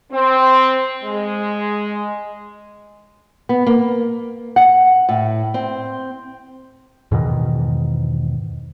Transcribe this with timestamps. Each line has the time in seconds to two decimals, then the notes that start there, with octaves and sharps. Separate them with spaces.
0.12 C4
1.03 G#3
3.49 B3
3.67 A#3
4.56 F#5
5.09 A2
5.54 C4
7.11 E2 G#2 B2 D#3